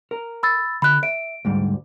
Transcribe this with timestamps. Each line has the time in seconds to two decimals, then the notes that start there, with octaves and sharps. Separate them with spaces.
0.11 A#4
0.43 B5 E6 A6
0.82 D3 B5 F#6
1.03 E5 D7
1.45 D2 G#2 G3